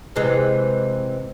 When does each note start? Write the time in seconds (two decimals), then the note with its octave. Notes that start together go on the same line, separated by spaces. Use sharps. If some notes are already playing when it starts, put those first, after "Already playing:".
0.16 C3 E3 G#3